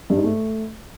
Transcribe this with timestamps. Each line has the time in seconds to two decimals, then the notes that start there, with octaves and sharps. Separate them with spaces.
0.10 G2
0.17 G#2
0.24 A3